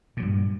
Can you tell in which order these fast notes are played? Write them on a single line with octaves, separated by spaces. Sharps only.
A#2 F#3 G2